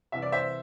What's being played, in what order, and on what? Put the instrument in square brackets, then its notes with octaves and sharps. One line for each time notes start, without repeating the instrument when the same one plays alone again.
[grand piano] C2 C3 E3 E5
D5
C5 E5